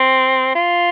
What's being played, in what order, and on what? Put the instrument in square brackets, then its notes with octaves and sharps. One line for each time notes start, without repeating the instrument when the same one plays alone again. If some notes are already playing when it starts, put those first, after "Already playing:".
Already playing: [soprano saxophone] C4
F4